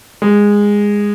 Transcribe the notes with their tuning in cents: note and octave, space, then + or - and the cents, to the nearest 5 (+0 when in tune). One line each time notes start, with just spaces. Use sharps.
G#3 -15